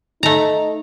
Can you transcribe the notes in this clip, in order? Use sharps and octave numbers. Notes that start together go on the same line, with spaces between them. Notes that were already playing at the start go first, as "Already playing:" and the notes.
A3 D#4 A#5